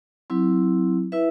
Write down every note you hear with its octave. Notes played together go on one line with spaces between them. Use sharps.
F#3 C4 E4
E4 B4 E5